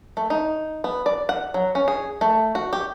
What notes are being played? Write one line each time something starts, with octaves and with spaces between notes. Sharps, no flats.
A3
D#4
B3
D5
F#5
F#3
C#4
G#4
A3
F#4
G4